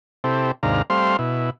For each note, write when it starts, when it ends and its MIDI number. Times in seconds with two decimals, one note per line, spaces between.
0.24 0.51 48
0.24 0.51 60
0.24 0.51 64
0.24 0.51 67
0.24 0.51 69
0.63 0.82 39
0.63 0.82 44
0.63 0.82 48
0.63 0.82 62
0.63 0.82 77
0.63 0.82 82
0.90 1.17 55
0.90 1.17 57
0.90 1.17 60
0.90 1.17 72
0.90 1.17 77
0.90 1.17 84
1.19 1.50 47
1.19 1.50 64